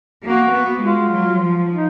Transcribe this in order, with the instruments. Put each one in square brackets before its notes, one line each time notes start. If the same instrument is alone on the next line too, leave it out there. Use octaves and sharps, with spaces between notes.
[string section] A#3 [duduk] F#4
[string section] B3
[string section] G#3 [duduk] F4
[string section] F#3
F3
[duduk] D#4